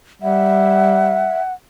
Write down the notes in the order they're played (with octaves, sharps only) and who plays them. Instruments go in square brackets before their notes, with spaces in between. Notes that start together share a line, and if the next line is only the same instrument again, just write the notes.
[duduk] G3 [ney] E5 [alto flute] F#5